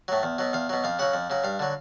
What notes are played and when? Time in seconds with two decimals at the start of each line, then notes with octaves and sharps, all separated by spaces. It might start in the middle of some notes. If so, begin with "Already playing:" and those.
0.08 A2 F#3
0.23 E2
0.39 B2 F#3
0.53 E2 F5
0.69 B2 F#3
0.84 F2 F5
0.99 C#3 F#3 F#5
1.14 F2
1.30 C#3 F#3
1.44 G2 F5
1.59 D3 F#3